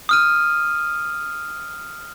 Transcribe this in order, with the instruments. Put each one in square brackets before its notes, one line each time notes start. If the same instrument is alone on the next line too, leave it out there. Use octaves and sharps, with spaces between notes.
[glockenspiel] D#6 F6 D#7